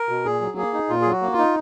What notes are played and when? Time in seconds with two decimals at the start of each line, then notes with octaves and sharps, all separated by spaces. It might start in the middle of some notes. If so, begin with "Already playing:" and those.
Already playing: A#4
0.09 B2
0.25 A#2 G#4
0.41 F#3
0.57 A#3 G#4
0.74 D#4
0.90 A#2 F4
1.02 G#4
1.06 F#3
1.11 F#4
1.22 A#3
1.33 F4
1.38 D#4